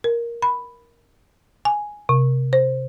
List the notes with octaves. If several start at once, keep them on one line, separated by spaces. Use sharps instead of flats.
A#4
B5
G#5
C3
C5